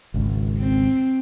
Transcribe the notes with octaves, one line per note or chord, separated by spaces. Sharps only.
G#1 C#2
C4